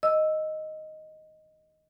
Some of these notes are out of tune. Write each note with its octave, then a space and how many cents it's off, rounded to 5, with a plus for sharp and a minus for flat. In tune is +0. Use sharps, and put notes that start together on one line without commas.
D#5 +0 E6 +0